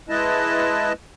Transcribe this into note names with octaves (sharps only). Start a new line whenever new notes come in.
G#3 E4 B4 D#5 A5